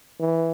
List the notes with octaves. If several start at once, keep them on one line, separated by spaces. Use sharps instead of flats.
E3